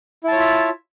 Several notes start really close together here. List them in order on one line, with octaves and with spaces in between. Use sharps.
E4 A5 C#5 F4 E5